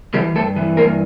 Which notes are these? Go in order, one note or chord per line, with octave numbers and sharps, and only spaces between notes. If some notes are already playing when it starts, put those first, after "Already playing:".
E3 G3 G4
G2 A3 A4
E3
G2 A#3 A#4